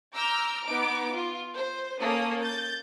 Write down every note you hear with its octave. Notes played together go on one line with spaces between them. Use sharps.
A#5 D6 E6 F6 G6
B3 D#4 D6 D7
F4
C5
A#3 C#4 A4 D#6
G6 A6